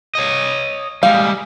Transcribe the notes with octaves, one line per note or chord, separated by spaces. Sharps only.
C#5 D#5
G3 G#3 F5